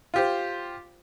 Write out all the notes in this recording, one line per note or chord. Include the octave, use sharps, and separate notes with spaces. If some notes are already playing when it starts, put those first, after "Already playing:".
F4 G4 C5